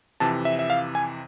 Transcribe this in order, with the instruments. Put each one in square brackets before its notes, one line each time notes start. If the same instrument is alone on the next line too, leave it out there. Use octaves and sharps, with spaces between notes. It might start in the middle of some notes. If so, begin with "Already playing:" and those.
[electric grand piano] F2 C3 E3 A5
E5
E5
F5
G#5